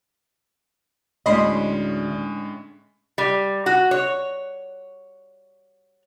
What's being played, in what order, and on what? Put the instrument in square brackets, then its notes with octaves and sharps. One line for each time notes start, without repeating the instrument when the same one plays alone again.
[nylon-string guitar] D2 [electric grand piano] A2 G#3 C#4 [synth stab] D#5 B5 C6
[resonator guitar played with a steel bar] G3
F#4
C#5